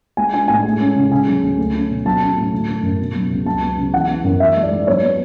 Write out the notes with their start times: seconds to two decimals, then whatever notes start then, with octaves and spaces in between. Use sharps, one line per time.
0.17 G#3 G#5
0.33 D4 G#5
0.48 A2 G#5
0.64 G#3
0.80 C#4
0.96 C#3
1.11 C#3 G#5
1.27 F#3
1.43 D2
1.58 A3
1.74 C#4
1.90 B2
2.05 F#3 A5
2.21 C#4
2.36 A2
2.52 D3
2.68 A3
2.83 F#2
3.00 B2
3.15 F#3
3.30 C#2
3.46 F#3 A5
3.62 B3
3.78 C#3
3.93 E3 F#5
4.09 B3
4.24 F#2
4.40 E3 E5
4.56 G#3
4.63 D5
4.71 G#2
4.87 F#3 C#5
5.02 B3